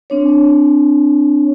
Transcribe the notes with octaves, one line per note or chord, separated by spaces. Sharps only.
C4 D4 C#5